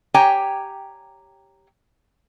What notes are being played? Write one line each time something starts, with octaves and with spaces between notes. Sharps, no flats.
G4 C#5 G5 G#5 A#5